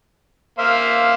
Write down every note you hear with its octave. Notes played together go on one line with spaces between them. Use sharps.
A#3 C5 E5 F5